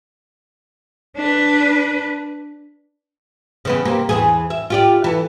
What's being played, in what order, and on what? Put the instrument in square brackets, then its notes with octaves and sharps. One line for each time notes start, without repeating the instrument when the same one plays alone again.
[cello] D4 B4
[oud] C#3 E3 B3
C3 A#3
E2 E3 G#4
E5
F4 G4 D5
E3 A4